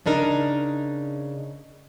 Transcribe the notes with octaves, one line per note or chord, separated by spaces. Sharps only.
C#3 D4 D#4 A#4